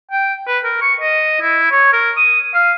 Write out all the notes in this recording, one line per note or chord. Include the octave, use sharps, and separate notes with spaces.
G5
B4
A#4
C#6
D#5
E4
C#5
A#4
D#6
F5